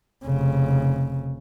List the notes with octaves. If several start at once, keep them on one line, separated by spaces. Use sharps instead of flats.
F1 C#3